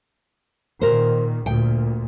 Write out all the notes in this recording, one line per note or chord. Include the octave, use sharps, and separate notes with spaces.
A#2 D#3 A#4 C5
D2 A#2 G5